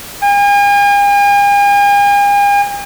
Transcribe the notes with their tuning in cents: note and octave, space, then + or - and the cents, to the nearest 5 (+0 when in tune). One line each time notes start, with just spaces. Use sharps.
G#5 -45